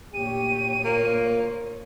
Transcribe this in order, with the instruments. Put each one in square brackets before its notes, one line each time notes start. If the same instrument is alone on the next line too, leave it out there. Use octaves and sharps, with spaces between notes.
[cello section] D2 A#2 C#5 [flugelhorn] G4 [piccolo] D#7
[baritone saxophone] A#3 [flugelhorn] F4